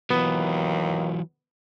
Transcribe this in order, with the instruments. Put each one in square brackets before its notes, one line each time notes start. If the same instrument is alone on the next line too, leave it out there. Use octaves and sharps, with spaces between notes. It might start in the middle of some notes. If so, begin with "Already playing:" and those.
[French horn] D#2 [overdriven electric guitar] E3 F#3 [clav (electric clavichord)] B3